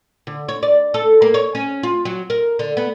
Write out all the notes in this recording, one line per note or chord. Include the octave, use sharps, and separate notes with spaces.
D3
C#5
D5
A4
A#3
C#5
C#4
F4
F#3
A#4
D3
B3